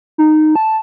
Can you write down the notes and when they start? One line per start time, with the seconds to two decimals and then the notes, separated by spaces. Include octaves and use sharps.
0.18 D#4
0.56 A5